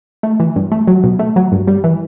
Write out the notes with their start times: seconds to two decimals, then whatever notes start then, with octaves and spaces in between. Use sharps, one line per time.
0.23 A3
0.40 E3
0.56 G2
0.72 A3
0.87 F#3
1.04 B2
1.19 A3
1.36 F#3
1.52 G2
1.67 G3
1.84 E3